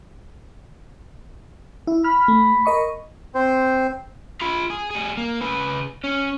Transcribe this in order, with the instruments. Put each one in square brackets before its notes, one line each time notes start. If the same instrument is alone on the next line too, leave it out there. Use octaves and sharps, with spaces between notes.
[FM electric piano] E4
[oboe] B5 [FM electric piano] F6
[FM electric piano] A3
A#4 D#5 C#6
[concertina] C4 C5
[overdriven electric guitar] F4 B5
G#4
G3 G#4
A#3
C#3 B4
C#4